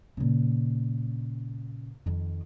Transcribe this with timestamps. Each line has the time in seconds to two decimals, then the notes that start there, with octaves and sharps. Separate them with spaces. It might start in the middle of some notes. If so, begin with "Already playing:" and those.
0.17 A#2 C#3
2.06 F2 D#3